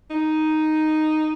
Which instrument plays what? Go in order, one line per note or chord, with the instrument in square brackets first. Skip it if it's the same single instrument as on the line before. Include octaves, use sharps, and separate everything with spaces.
[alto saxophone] D#4